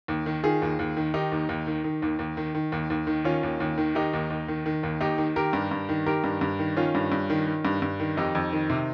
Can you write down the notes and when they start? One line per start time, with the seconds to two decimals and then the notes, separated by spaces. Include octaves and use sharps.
0.08 D#2
0.26 D#3
0.43 D#3 F4 G#4
0.62 D#2
0.79 D#2
0.97 D#3
1.14 D#3 D#4 G4
1.32 D#2
1.49 D#2
1.67 D#3
1.84 D#3
2.02 D#2
2.19 D#2
2.37 D#3
2.55 D#3
2.72 D#2
2.90 D#2
3.07 D#3
3.24 D#3 C#4 F4
3.43 D#2
3.60 D#2
3.78 D#3
3.95 D#3 D#4 G4
4.13 D#2
4.30 D#2
4.48 D#3
4.66 D#3
4.83 D#2
5.01 D#2 D#4 G4
5.18 D#3
5.36 D#3 G4 A#4
5.53 G2
5.71 G2
5.89 D#3
6.06 D#3 G4 A#4
6.24 G2
6.41 G2
6.59 D#3
6.76 D#3 C#4 F4
6.95 G2
7.12 G2
7.30 D#3
7.47 D#3
7.65 G2
7.82 G2
8.00 D#3
8.17 F2 D#4 G4
8.35 F2
8.53 D#3
8.70 C3